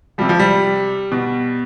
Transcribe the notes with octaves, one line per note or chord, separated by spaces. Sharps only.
C3 F3 G3
F3
G3
B2